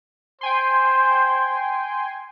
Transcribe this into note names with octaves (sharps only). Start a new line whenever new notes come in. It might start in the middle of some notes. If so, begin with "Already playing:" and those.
C5 G5 G#5 C6